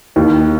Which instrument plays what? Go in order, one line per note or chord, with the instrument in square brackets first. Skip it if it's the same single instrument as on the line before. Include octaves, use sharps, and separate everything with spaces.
[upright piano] D#2